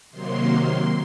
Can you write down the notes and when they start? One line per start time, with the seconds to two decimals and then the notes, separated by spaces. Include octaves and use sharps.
0.11 C3 D#3 F#3 A#3 C6